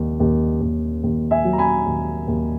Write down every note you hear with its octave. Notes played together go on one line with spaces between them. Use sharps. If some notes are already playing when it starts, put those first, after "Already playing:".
Already playing: D#2
D#2
D#2
D#2
E5 G#5
F#3
A#5
G#5 B5
D#2
D#2